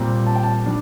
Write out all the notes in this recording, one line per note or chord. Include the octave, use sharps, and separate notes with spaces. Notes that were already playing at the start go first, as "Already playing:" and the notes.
Already playing: A#2 G3 C4 A#5
A5
G5
A5
G3 D4